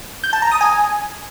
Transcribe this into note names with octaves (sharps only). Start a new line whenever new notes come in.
G6
A5
A#5
D#6
G#5